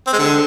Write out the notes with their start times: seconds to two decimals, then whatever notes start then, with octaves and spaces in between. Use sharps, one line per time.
0.07 C4
0.13 G#3
0.19 D3